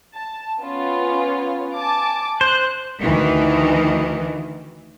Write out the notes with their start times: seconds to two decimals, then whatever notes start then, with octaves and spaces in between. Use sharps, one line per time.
0.15 A5
0.62 B3 C#4 F4
1.76 G#5 A5 D6
2.41 C5 F#6
3.02 D2 D#3 E3